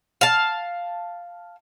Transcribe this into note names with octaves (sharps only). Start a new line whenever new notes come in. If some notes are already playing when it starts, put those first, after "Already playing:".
F5 A5